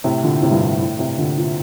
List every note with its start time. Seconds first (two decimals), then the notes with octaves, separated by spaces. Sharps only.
0.04 A2 C3
0.23 A#2 D3
0.42 A2 C3
0.51 G2 A#2
0.62 A2
0.80 A2
0.99 A2 C3
1.18 A#2 D3
1.37 A#2